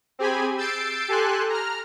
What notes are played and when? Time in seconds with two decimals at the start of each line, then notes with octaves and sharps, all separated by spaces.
0.19 C4 G4 G#4 G#5 B5
0.58 E6 G6 A6 C7 D7
1.08 G4 A4 G#5 C6 F#6
1.50 A#5 F6